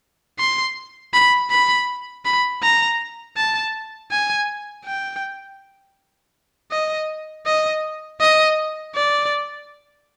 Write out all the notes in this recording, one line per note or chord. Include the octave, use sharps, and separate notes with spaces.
C6
B5
B5
B5
A#5
A5
G#5
G5
D#5
D#5
D#5
D5